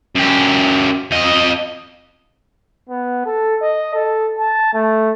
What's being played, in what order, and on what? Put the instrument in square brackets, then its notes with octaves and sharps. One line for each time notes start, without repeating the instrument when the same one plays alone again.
[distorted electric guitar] F#2 G4
F2 D#5
[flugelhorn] B3
A4
D#5
A4
A5
A3